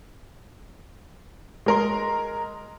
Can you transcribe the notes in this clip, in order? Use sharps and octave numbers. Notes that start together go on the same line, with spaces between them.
G#3 A#4 C6